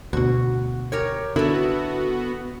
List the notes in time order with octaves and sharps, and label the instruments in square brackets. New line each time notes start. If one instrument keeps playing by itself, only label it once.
[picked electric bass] D2 B2 [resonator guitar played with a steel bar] F#4
[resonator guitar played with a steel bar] G4 A#4 C#5
[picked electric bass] D3 [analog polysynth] B3 F#4 [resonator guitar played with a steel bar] E4 A4